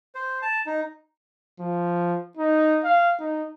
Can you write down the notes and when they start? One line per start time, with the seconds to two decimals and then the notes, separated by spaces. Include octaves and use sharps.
0.15 C5
0.42 A5
0.66 D#4
1.60 F3
2.37 D#4
2.84 F5
3.20 D#4